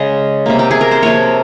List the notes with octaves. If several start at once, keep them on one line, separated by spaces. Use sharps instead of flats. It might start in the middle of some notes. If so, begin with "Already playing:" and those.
Already playing: C#3 G#3 D#5
C3 G3 A#3
G4
G#4
A#4
C5
C3 F3 A#3 C#5